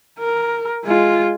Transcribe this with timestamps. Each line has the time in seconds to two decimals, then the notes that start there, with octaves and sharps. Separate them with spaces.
0.19 A#4
0.84 G#3 F4